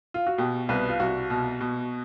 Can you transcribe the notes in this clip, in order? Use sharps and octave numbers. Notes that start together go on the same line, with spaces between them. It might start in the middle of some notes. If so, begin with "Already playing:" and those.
F4
F#4
B2 G4
C2 B4
F4
C2 F#4
B2
B2